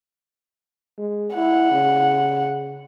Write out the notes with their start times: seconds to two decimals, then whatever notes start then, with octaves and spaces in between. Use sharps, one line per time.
0.99 G#3
1.35 E4 F#5
1.72 C#3